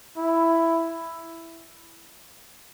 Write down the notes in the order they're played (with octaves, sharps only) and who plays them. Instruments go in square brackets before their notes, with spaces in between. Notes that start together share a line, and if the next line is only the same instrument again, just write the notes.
[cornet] E4